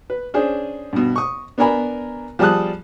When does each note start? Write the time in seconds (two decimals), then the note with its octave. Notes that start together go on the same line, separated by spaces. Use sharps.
0.10 B4
0.34 C#4 D4 G#4 C5
0.93 G2 B2
1.16 C#6 D#6
1.58 B3 D4 A#4 G#5 A#5 B5
2.39 F3 G3 G#4 A5 D#6 F#6